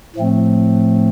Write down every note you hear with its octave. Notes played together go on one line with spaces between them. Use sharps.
A2 F3 A3 C4